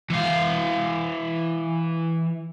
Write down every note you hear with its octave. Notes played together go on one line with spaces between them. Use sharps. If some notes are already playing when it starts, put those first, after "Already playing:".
E3 F5